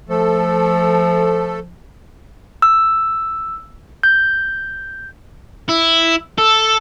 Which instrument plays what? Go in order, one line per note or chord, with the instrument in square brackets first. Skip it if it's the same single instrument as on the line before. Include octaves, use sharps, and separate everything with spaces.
[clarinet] F3 [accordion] A3 A4
[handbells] E6
G6
[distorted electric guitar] E4
A4